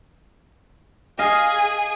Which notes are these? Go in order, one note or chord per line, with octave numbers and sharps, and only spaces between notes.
G#4 D#5 F5 D#6